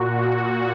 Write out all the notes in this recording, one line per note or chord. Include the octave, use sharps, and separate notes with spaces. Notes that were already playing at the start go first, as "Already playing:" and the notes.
Already playing: A#2 F#4